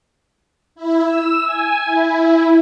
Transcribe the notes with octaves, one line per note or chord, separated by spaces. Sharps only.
E4
E6
G#5
E4